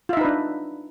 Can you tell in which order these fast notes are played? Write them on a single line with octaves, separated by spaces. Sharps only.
F4 E5 D#4 B4 D4